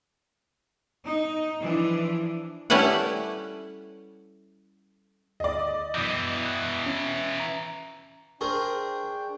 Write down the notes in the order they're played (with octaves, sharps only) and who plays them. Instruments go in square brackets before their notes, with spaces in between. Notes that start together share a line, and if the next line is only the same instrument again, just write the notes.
[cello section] D#4
E3 F3 D4
[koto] G3 A3 C#4 E4 B4 F#5
[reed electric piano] D2 [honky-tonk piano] D5 D#5
[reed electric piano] F#2 D#6 G6 [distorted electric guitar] B2 E3
[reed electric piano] F#6
C#4
A#5
[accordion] D4 G5 [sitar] G#4 [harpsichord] A#4 C5 [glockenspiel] C#6